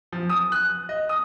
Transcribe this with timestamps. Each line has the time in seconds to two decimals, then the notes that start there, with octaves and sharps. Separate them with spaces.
0.12 F3
0.29 D#6
0.52 F#6
0.89 D#5
1.09 D#6